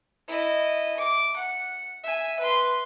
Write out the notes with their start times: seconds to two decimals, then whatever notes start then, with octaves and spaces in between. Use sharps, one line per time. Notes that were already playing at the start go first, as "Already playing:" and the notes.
0.28 E4 D#5
0.98 D6
1.36 F#5
2.04 E5 G#5
2.40 B4 C6